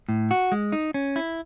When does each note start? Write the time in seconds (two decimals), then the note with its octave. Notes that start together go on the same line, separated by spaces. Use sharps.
0.09 A2
0.31 F#4
0.52 G#3
0.72 D#4
0.94 C#4
1.16 E4